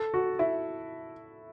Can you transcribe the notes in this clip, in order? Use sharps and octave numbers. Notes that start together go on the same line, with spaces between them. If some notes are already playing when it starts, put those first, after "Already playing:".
Already playing: A4
F#4
E4